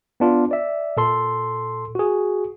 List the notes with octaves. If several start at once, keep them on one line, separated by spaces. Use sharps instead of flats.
B3 D4 F4
D5 E5
A#2 A4 C6
F#4 G#4